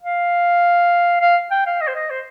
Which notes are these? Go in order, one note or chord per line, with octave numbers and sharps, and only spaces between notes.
F5
F5
G5
F5
D#5
C5
D#5
C5